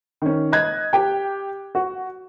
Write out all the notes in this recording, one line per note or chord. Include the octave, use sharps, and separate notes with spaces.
D#3 C#4
D#5 F#6 G#6
G4 G5
F#4